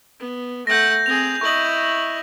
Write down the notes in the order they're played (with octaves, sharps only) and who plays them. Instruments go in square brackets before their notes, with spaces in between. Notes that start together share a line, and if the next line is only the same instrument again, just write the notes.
[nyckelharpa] B3
[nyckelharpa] A3 F#5 [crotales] G6 A#6
[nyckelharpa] C4 G#4 [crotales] F7
[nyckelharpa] E4 D#5 [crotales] C#6 F#7